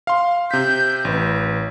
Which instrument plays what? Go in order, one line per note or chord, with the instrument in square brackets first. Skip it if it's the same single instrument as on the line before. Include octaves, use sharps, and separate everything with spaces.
[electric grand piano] F5 C6
[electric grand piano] C3 B6 [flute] G6
[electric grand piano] A1 [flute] B4